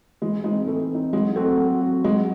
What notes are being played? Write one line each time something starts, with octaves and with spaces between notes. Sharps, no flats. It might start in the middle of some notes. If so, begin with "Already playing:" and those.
E3 G#3
G#3 C4 D#4
E3 A3
C4 D#4
F#3 G#3
A3 C4 F#4
F#3
C4 F#4
F#3 G#3